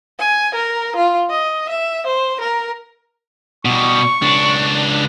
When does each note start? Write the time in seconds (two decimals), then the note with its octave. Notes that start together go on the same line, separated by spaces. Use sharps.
0.19 G#5
0.54 A#4
0.96 F4
1.30 D#5
1.69 E5
2.06 C5
2.40 A#4
3.65 B2 G3 C#6
4.22 C#2 D4